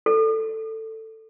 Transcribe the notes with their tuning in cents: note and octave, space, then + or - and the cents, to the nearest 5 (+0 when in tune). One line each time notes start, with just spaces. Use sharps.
A4 +10